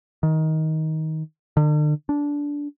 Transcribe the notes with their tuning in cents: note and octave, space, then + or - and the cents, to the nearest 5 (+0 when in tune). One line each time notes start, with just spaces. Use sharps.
D#3 +20
D3 +45
D4 -15